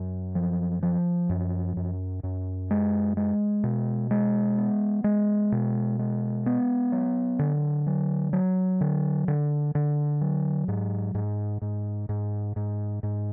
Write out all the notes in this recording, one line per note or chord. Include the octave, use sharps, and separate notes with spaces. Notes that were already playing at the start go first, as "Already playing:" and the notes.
Already playing: F#2
F3
F3
F#2
F#2
F#2
G#3
G#3
B2
G#3
B3
G#3
B2
G#3
B3
F#3
D3
F#3
F#3
D3
D3
D3
F#3
G#2
G#2
G#2
G#2
G#2
G#2